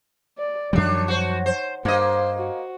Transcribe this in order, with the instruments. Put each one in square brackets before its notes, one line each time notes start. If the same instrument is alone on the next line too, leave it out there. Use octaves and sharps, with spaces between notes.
[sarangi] D5
[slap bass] F#2 F3 G3 [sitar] D#3 D4 [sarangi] C#5
[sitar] F#4 C5
C5
[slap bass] G2 [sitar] A#3 D#5 [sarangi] C5
[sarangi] F#4